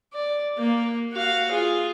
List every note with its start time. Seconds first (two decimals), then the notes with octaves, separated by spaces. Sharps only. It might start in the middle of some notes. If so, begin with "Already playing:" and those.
0.13 D5
0.58 A#3
1.12 F#4 F5
1.52 F4 G#4